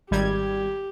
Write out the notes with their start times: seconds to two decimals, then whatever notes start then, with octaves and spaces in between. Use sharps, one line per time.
0.11 G#1 G3 G4 G#6